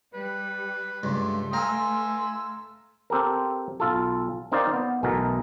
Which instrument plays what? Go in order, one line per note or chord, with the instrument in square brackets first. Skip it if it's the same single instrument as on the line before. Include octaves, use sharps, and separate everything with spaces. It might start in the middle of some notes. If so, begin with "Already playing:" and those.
[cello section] G3 [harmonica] B4
[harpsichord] C#2 G2 [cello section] A3 [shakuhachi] C6
[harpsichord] F5 A#5 [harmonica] G#5 E6
[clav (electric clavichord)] C4 G4 A4 A#4
B1 F4 A4
C4 D#4 A#4 C5 D5 F5
B3
B1 B2 E3 A3 A#4 D#5